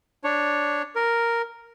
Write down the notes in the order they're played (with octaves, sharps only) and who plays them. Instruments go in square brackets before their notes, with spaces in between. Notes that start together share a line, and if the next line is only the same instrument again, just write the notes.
[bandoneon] D4 C#5
A#4